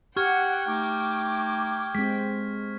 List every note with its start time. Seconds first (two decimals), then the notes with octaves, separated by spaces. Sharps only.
0.17 G4 F#5 G5 C#6 F6 G#6
0.68 A3 D#4 D6
1.95 G#3 C4 B6